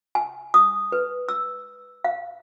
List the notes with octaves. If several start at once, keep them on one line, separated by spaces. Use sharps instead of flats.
G#5
D#6
B4
E6
F5